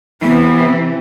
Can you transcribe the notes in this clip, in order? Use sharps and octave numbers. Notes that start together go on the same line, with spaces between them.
C3 E3 B3